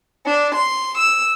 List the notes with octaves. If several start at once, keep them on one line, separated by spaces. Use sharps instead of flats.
D4
C6
E6